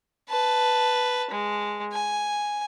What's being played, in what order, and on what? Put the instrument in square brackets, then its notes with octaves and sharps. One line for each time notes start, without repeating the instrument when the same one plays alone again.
[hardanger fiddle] B4 A5
G#3
G#5